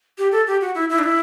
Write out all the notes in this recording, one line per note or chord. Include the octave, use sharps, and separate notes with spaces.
G4
A4
G4
F#4
E4
E4
D4
E4